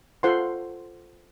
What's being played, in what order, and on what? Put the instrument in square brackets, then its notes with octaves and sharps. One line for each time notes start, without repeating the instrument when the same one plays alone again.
[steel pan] F4 A4 C5 F#5 C6